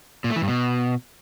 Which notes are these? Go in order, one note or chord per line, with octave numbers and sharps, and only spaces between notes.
A#2
A3
E3
G2
B2